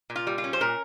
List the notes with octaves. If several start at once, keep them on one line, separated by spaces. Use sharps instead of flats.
A#2
F4
G3
F4
C#4
C5
A#2 A#4